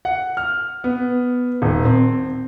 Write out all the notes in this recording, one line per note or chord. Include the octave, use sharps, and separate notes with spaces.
F#5
F6
B3
D#1
C4